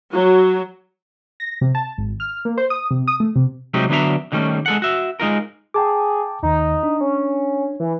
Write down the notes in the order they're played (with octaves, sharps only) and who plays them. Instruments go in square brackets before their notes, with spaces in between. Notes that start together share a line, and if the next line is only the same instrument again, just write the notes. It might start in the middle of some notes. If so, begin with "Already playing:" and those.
[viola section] F#3
[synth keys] A#6
C3
A5
G#1
F6
A#3
C5
D#6
C3
D#6
A3
C3
[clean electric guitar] C3 F#3 G#3 A3 D#4 G4
D3 F#3 B3 D4 E5 A#5
D3 D#3 G3 A3 C#4
G#3 A4 F#5
F#4 E5
G#3 D#4 F4 A#4
[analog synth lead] G#4 [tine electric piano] G5 A5 D6
[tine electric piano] D#2 D#3 [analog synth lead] D#4
[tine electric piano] D4
[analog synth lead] C#4
E3